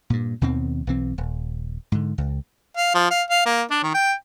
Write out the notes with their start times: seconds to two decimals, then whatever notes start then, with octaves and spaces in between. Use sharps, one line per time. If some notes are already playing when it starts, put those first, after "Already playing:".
0.10 G2 A#2
0.41 D#2 B2 D#3 C4
0.87 B1 E3 C4
1.18 D#1
1.92 G#2 D3
2.18 C#2
2.76 F5
2.94 F3
3.11 F5
3.30 F5
3.46 A#3
3.70 D4
3.83 D#3
3.94 G5